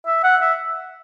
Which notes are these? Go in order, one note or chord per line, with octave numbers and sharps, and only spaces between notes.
E5
F#5
E5